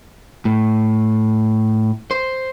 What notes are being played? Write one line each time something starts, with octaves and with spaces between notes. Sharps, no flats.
A2
C5